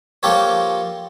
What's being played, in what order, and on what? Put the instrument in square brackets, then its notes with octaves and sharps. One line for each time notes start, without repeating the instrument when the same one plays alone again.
[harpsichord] F3 A#3 F4 G4 A4 C#5